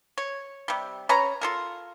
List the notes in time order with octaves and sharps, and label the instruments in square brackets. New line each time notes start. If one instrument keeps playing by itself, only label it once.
[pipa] C#5
C3 G3
C#4 B4 C#5 A#5
F4 A4 A#4